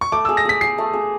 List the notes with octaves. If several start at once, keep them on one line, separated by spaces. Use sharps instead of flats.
C#6
A3 D6
E6
G#4
A#6
G#4 B6
G#4 C7
A3
G#4